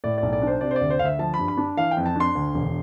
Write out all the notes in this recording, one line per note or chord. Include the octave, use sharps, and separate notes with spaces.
A2 D5
B1 D5
D5
D4
C5
C3 D5
C5
D5
D2
C5
D2 F5
E5
F3 A5
B5
G2
B5
D4
E3 F5
G5
F2
A5
D4 C6
D2
E1